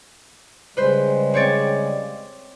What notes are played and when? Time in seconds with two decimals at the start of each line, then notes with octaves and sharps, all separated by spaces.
0.77 C#3 G3 G#3 B4 C5
1.34 C4 C#5 D5